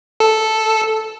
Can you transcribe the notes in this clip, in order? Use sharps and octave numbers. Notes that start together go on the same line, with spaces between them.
A4